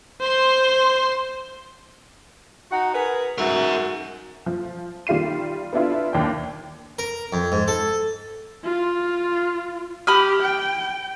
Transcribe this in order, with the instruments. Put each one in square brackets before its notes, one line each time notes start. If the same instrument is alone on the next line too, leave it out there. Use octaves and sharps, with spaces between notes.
[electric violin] C5 C6
[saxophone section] D#4 F#4 F#5
G#4 A#4 B4
[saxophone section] G#2 F#4 [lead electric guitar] A#4 E5
[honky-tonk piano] F3
D#3 G3 F4 C7 D#7
B3 D4 E4 F4
D#2 D4 G5
[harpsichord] A#4
F2
G#2
A4
[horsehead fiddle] F4
[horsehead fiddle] G4 [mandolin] B5 D#6 F6
[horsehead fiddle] G5